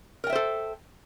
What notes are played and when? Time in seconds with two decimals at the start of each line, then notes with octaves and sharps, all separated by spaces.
0.24 A#4
0.27 G5
0.30 E5
0.33 C5
0.35 A4